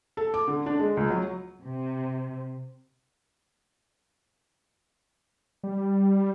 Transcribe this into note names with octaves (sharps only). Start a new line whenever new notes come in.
A4
D6
D3
D4
G#3
C#2
F#3
C3
G3